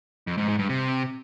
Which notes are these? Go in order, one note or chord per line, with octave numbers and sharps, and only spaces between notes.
F2
G#2
G#2
G2
C3